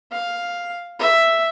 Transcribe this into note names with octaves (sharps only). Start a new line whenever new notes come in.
F5
E5